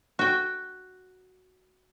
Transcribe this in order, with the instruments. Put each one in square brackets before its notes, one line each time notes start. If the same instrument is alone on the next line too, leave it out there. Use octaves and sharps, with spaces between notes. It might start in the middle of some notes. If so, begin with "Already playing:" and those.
[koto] F#4 G5